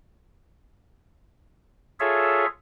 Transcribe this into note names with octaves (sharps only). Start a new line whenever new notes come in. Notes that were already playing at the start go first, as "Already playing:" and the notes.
F4 G#4 A4 C#5 E5